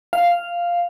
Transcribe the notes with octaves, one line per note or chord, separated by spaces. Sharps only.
F5